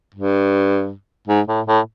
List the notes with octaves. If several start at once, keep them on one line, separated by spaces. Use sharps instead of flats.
G2
G#2
A2
A2